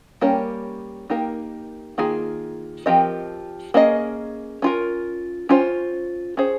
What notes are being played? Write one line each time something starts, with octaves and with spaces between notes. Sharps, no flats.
G3 A#3 C#4 G4 A#4
A#3 D#4 G4 A#4
D#3 A#3 F4 G#4
F3 C4 G4 A#4 D#5
A#3 C#4 G#4 D#5
C#4 F4 A#4
C#4 F4 C5
C#4 G#4 C5